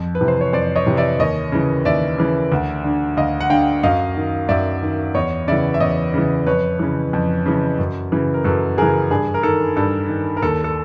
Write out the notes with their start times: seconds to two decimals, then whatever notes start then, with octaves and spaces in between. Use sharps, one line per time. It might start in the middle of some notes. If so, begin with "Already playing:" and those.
Already playing: F2
0.15 B4
0.21 C3 E3
0.28 C5
0.41 C#5
0.53 F2 C5 D5
0.75 C#5 D#5
0.86 C3 E3
0.97 D5 E5
1.19 D#2 C#5 D#5
1.52 C#3 E3
1.85 D#2 D5 E5
2.18 C#3 E3
2.52 D2
2.84 D3
3.17 D2 D#5 F5
3.40 F#5
3.50 D3 F5 G5
3.83 F#2 D#5 F5
4.17 D#3
4.49 F#2 D5 E5
4.83 D#3
5.15 E2 C#5 D#5
5.47 C#3 E3 D5 E5
5.74 E5
5.80 E2 C#5 D#5
6.14 C#3 E3
6.46 F2 B4 C#5
6.79 C#3 E3
7.13 F2
7.46 C#3 E3
7.79 F#2
8.12 C#3 E3
8.34 A#4
8.44 F#2 A4 B4
8.78 C#3 E3 G#4 A#4
9.11 G2 G#4
9.34 A#4
9.43 D#3 A4
9.77 G2 A4
10.09 D#3
10.37 A#4
10.42 D#2 A4
10.64 A4